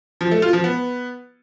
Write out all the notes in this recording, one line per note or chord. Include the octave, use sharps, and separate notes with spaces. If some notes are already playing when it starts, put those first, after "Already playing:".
F3
A3
F4
F3
B3